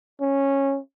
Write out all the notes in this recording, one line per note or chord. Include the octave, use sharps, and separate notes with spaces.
C#4